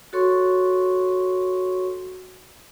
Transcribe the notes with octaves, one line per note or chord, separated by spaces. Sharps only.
F#4 A4 C#5 C6 C#6